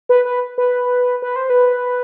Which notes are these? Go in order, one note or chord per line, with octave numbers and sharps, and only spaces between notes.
B4
B4
B4
B4
C5
B4